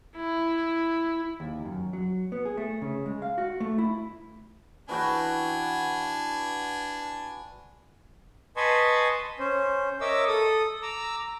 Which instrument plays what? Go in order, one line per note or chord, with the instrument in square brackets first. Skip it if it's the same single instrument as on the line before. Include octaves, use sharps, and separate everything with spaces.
[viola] E4
[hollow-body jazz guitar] D#2
F#2
F#3
B3
G#4
A3
C#3
G#3
F5
F#4
A3
E4
[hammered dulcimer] E3 F#4 G5 [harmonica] D4 G#5
[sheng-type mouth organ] B4 D#5 G#5 A5 C6 C#6
C#4 C5
A#4 C#5 D#5 E5 D6 E6
A4 D#6
A#5 D6 E6